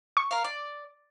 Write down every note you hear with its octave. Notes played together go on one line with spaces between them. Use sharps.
C#6
A#4 F5
D5